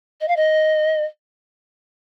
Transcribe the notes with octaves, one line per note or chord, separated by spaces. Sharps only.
D#5
F5
D#5